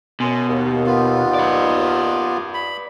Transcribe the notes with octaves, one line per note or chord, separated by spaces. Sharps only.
F#2 B2 G#5 C6
D#2
B3 F4
B4 D5
B5